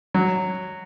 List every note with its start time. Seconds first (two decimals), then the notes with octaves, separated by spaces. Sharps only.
0.14 F#3